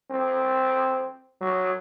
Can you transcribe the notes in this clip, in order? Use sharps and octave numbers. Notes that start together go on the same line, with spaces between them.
C4
F#3